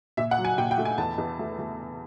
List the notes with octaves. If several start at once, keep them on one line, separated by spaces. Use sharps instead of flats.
A#2 E5
F#5
F#3
G#5
A#2 G5
G5
A3
G#5
E2 A5
E2
A3
A3